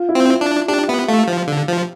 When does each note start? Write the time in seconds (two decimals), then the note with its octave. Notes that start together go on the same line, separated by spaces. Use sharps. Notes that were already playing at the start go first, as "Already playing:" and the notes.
Already playing: F4
0.09 E4
0.15 C4
0.28 E4
0.41 D4
0.68 D4 G4
0.88 B3 E5
1.08 A3 F5
1.27 F3 F5
1.47 D3
1.67 F3